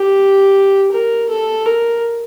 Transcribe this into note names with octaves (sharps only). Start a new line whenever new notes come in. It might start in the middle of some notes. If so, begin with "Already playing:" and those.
Already playing: G4
A#4
A4
A#4